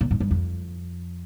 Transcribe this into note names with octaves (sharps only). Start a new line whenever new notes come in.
A#2
G#2
G2
F2